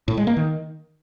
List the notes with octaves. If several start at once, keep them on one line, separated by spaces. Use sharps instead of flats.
A2
G#3
A#3
D#3